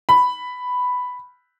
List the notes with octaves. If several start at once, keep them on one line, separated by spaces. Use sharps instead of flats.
B5